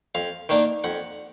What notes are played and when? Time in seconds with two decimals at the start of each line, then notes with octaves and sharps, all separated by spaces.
0.15 F2 F5
0.49 D#3 A#3 D4
0.84 F2 F#5